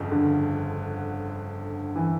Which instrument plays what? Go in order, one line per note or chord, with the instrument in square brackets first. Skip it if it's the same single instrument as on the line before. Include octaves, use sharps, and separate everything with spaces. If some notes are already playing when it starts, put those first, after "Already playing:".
Already playing: [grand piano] G1 F2 C#3
[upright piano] D3
E3